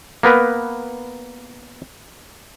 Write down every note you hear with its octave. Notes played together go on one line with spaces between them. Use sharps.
A#3 B3 A#4 B4